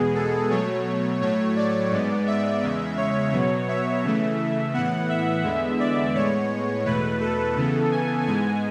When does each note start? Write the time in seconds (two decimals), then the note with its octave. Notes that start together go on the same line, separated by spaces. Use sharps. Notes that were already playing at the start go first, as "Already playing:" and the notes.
Already playing: E2 B2 G#3 B3 G#4
0.15 A4
0.50 B2 F#3 A3 C#5
1.21 A2 F#3 A3 C#5
1.56 D5
1.91 G#2 G#3 B3
2.27 E5
2.62 E2 C#3 G#3
2.97 C#5
3.32 B2 F#3 B3
3.68 E5
4.04 C#3 E3 A3
4.74 A2 E3 B3 F#5
5.09 E5
5.44 E2 D3 G#3 B3
5.79 D5
6.15 A2 G#3 B3 C#5
6.85 E2 B2 A3 B4
7.21 A4
7.56 C#3 E3 B3
7.91 G#5
8.27 G#2 G#3 B3 G#5